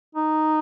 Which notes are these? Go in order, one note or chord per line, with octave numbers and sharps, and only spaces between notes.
D#4